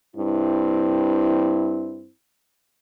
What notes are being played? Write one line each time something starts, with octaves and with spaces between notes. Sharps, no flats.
G2 C4 E4